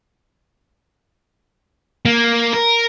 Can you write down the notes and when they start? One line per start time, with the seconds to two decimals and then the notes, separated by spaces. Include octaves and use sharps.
2.05 A#3
2.53 A#4